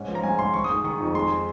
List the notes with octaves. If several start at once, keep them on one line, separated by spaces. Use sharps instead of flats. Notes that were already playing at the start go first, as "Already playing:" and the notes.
Already playing: G#2 C#4
F3
A#5
G#2 G#5
G#2 C6
D#3 C#6
D#6
G#3
D#3 C#6
F2
G#3 C6